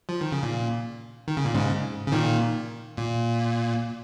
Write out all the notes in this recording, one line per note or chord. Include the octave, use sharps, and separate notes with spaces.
F3
D#3
C#3
A#2
D#3
C#3
A#2
G#2 C#3
C#3
A#2 D#3
A#2